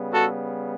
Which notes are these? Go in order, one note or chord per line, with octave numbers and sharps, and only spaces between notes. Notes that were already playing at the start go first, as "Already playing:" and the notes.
Already playing: C#3 G3 B3
F#4 A4